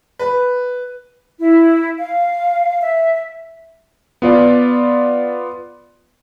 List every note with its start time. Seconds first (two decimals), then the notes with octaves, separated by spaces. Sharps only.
0.19 B4
1.39 E4
1.99 F5
2.81 E5
4.22 B3 F4 D5